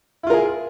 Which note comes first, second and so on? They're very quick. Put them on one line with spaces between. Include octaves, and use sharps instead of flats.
E4 F4 A#4 G#4